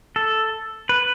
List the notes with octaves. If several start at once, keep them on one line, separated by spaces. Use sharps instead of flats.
A4
B4